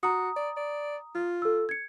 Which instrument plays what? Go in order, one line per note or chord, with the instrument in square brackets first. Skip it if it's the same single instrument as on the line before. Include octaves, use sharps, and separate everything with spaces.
[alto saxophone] F#4 [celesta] A#5 D#6
[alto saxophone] D5
D5
F4
[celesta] A4 E6
G#6 C#7